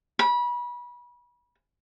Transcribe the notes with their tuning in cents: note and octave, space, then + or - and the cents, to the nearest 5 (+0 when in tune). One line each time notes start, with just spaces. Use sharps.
B5 -30